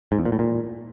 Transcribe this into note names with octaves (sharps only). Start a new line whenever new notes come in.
G#2
E2
A#2
A2
A#2